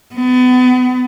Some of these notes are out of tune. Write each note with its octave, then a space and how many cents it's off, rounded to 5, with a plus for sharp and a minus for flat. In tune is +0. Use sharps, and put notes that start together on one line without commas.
B3 +30